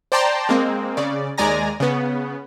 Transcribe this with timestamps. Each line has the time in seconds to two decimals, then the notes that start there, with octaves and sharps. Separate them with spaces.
0.12 C5 D5 G5 A5 A#5 C6
0.49 G#3 A#3 C4
0.97 C#3 D5
1.38 D#2 G#3 D5 G#5 A#5 A#6
1.80 C#3 B3